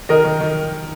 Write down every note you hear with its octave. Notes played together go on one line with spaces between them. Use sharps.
D#3 A#4 D#5
D#3
D#3